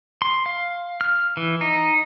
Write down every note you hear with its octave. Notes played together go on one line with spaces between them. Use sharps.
C6
F5
F6
E3
D#4